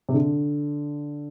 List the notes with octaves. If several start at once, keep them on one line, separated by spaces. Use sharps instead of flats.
C3
D3